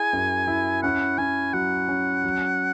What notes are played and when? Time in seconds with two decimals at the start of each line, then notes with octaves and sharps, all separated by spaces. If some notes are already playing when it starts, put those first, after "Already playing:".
Already playing: E4 G#4 G#5
0.13 F#2
0.48 E4
0.83 C#4 F#5
1.18 C#4 G#5
1.53 F#3 F#5
1.88 C#4
2.24 F#3